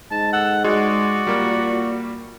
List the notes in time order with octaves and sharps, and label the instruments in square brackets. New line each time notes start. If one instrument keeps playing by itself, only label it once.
[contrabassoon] G#2 [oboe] A5
[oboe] A4 [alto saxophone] F#5
[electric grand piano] G#3 [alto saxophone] F#4 [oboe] D5
[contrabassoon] A#2 [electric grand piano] G3 A#3